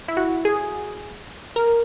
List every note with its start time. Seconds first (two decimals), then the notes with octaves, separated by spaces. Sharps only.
0.08 E4
0.17 F#4
0.45 G#4
1.56 A#4